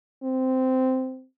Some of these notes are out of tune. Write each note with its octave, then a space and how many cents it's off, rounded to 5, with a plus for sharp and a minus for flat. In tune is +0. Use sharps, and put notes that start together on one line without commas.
C4 -10